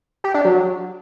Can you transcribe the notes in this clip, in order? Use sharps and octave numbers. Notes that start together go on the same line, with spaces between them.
G4
D4
F#3